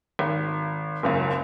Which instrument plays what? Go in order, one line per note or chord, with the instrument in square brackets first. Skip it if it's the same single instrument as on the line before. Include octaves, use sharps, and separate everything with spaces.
[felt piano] G#1
F#1 C#2 F#2